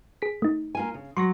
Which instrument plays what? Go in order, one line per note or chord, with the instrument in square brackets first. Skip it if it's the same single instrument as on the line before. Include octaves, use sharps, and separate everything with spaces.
[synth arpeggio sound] G#4 B6
A3 D#4
[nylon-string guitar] A#3 F4 G#5
C#3
[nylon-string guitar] F#3 [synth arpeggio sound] C6 C#6 A#6